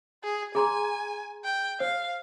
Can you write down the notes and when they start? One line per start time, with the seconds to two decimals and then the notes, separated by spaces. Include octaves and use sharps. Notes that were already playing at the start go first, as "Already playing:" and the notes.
0.24 G#4
0.55 G#4 G#5 A#5 C6
1.44 G5
1.80 C5 F5